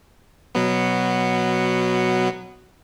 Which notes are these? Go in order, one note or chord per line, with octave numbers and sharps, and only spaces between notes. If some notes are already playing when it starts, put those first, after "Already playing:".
B2 F#3 B3